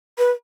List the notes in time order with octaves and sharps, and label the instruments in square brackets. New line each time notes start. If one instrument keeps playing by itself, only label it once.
[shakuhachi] B4